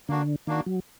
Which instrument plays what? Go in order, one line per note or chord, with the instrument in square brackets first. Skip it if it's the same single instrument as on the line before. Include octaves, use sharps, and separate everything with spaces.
[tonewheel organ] D3 [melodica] A#3 D4 F#4
[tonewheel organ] D#3 [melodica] A#3 D4 F#4
[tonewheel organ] F#3